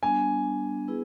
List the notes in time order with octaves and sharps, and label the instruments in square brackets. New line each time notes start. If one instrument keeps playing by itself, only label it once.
[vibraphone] G3 B3 D4 [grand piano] G#5
[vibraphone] B3 E4 G#4 B4